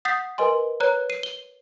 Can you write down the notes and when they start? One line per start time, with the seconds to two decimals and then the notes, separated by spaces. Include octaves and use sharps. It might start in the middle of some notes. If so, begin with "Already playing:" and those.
0.05 F#5 D#6 G6 A6 B6 C7
0.38 A#4 B4 D#5 G#5 C6
0.80 B4 C#5 A#5 F#6
1.10 C7 D#7
1.23 G7